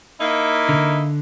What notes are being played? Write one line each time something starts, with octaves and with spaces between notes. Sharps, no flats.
A#3 D#4 E4
D3